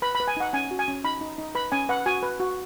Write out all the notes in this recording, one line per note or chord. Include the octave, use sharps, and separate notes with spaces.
B4 B5
B5
B4
G#5
D#4 F#5
C#4 G#5
F#4
G#5
C#4
D#4 B5
D#4
D#4
B4 B5
C#4 G#5
B4 F#5
F#4 G#5
B4
F#4